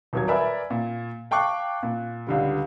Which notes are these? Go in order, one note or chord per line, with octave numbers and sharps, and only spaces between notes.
D#1 F#3 G#6
A#4 B4 D5 E5 G#5 B5
A#2
F5 G5 A5 C#6 D6 F#6
A#2
C#2 D3 G3